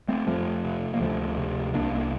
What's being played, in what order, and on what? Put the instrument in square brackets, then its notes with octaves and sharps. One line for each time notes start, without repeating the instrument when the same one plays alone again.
[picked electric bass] A3 C4
F2 F3 A3
C3
A#3
D2 F3 A3
C3
C2 A#3 D4
A#3 D4